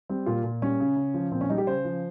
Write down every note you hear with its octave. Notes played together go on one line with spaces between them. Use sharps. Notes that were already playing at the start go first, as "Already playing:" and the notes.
G3 C4
A#2 F4
A#2
G3 C#4
C#3
C#3
F3
A#2 C4
C#4
G3 D#4
G4
C#3 C5
F3